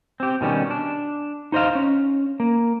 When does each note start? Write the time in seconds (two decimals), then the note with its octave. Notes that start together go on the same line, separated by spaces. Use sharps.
0.20 C4 G4
0.41 B2 D#3 G3 C#4
0.71 D4
1.52 D#4 C5 D#5 F5
1.75 C#4
2.40 A#3